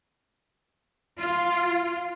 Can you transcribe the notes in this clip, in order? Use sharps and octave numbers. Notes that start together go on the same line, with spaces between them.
F4